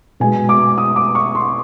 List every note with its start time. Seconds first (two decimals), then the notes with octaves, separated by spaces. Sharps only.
0.20 B2 G#3 G#5
0.49 D6
0.78 D#6
0.96 D6
1.15 C#6
1.35 C6